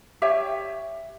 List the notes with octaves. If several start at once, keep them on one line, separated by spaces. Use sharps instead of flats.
G4 C#5 E5 G5